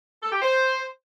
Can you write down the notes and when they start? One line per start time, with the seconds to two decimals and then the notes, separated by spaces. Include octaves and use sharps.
0.23 A4
0.32 G4
0.42 C5